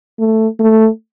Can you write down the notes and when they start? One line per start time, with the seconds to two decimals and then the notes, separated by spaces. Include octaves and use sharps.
0.19 A3
0.60 A3